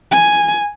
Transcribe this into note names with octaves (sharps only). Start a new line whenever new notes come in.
G#5